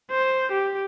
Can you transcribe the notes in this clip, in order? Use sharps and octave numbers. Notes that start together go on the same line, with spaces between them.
C5
G4